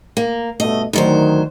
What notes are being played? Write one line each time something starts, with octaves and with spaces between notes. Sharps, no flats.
A#3
G2 B2 A3 D#5
D2 D#3 F#3 C5